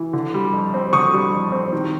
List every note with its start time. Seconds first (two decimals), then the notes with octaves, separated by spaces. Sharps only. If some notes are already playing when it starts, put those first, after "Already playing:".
Already playing: E3
0.13 D3
0.34 G3
0.53 F2
0.74 C4
0.93 D3 C#6 D#6
1.13 G3
1.33 F2
1.52 C4
1.73 D#3